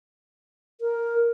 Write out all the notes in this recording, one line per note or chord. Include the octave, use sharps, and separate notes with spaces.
A#4